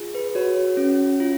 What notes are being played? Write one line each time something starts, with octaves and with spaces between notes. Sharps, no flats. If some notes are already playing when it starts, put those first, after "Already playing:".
Already playing: F4 G#4
B4
F#4 C#5
C#4
F4